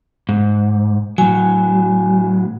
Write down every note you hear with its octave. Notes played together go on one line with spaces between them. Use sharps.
G#2
A2 F#3 G#5